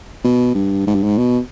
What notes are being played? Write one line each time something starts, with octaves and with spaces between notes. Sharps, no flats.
B2
G2
G#2
G2
G#2
B2